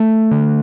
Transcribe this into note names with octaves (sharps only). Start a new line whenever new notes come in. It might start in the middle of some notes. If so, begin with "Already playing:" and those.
Already playing: A3
D3